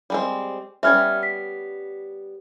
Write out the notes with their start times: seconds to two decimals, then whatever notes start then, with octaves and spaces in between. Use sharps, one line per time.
0.10 G3 G#3 C4
0.83 G3 B3 C#4 E5 F6 G#6
1.23 B6